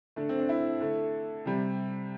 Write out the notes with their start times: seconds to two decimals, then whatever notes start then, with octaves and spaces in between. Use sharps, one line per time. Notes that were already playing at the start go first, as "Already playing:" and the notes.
0.16 D3 A3 D4
0.29 C4
0.39 D4
0.49 E4
0.80 D3 A3
1.45 C3 G3